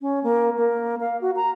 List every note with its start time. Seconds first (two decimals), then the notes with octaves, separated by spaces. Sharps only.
0.02 C#4
0.24 A#3
0.57 A#3
1.01 F5
1.21 F#4
1.36 A#5